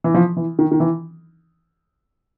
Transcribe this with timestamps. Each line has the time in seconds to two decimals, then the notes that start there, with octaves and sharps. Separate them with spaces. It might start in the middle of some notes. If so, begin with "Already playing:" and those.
0.04 E3
0.15 F3
0.37 E3
0.59 D#3
0.72 D#3
0.80 E3